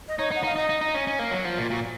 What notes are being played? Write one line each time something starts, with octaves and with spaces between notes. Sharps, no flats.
D#5
D#4 C#5
D#4
F#5
D#4 F5
D#4 D#5
D#4
D#4
C#4
C#4
A#3
F#3
F3
A#2
A#2 F#4